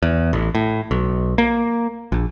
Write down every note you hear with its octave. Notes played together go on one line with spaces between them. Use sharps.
E2
A1
A2
B1
A#3
A#1